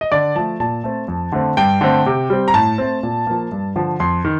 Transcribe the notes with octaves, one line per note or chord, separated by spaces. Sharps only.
D#5
D3 D5
F3 A3 A5
A#2 A5
A3 C4
F2
D3 A3 C4
G2 G5
D3 A3 C4
C3
G3 C4
A#5
A2 A5
A3 C4
A#2
F3 A#3
G2
D3 F3
F2 C6
D#3